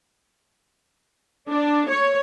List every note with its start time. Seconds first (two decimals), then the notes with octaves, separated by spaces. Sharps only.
1.50 D4
1.89 C#5